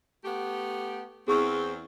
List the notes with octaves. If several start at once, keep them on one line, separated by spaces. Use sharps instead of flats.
A3 B3 G4
E2 C4 G#4 C#6